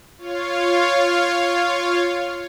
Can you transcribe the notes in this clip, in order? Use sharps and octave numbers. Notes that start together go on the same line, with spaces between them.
F4 C#5 F5